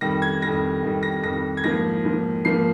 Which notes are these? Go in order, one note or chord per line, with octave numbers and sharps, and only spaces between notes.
F2 D#3 G3 A#6
G#6
F2 D#3 G3 A#6
F2 D#3 G3
A#6
F2 D#3 G3 A#6
G#6
G#2 F3 A#3 A#6
G#2 F3 A#3
G#2 F3 A#3 C7